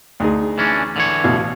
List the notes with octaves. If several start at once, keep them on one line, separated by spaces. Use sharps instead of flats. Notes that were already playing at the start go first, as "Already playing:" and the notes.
D2 D#4 G#4
E3 C#4 D4
D3 E3 C#5
A1 B2 F5